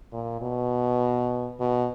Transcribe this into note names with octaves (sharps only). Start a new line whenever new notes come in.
A#2
B2
B2